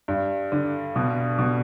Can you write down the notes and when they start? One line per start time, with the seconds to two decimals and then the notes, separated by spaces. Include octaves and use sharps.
0.08 G2
0.52 D3
0.96 B2
1.39 B2